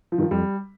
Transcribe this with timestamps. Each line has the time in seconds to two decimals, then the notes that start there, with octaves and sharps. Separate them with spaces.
0.12 F3
0.18 G2 D#3
0.22 F3
0.31 F2 G3